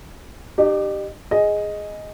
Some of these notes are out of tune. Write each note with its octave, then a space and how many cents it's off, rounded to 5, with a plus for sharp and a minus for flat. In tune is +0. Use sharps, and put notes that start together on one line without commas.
D#4 -45 G4 +0
G#4 +0 D#5 +0